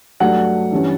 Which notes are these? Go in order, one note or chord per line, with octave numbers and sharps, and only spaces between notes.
G2 F#3 A3 D4 F#5
G2 E3 G3 C#4